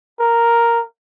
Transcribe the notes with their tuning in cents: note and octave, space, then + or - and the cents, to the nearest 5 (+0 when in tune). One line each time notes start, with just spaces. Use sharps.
A#4 +0